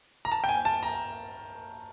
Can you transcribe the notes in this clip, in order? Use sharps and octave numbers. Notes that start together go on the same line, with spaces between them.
A#5
A5
G5
G#5
A5
A#5